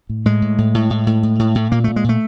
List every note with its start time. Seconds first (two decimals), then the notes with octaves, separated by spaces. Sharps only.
0.09 A2
0.25 A2 G#3
0.42 A2
0.58 A2
0.74 A2
0.90 A2
1.07 A2
1.23 A2
1.39 A2
1.55 A2
1.72 A#2 A#3
1.84 A#2 A3
1.96 G#3
2.04 A#2 A3